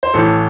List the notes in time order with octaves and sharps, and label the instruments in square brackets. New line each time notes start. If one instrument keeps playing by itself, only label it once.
[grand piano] C5
A1 A2 E3 A4